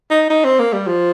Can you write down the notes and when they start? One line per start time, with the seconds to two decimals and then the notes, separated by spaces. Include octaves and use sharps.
0.11 D#4
0.30 D#4
0.44 C4
0.59 A#3
0.73 G3
0.87 F3